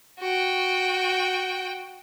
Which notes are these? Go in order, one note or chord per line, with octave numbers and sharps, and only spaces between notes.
F#4 G5